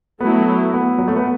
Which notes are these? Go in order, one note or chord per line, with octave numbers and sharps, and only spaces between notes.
F#3 A3 B3 E4
B3
F#3
A3
B3